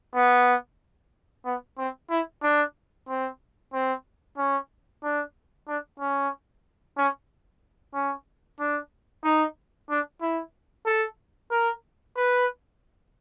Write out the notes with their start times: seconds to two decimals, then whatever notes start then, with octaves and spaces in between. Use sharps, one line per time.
0.15 B3
1.45 B3
1.78 C4
2.10 E4
2.43 D4
3.08 C4
3.73 C4
4.38 C#4
5.03 D4
5.68 D4
6.00 C#4
6.98 C#4
7.94 C#4
8.59 D4
9.24 D#4
9.90 D4
10.21 E4
10.86 A4
11.51 A#4
12.17 B4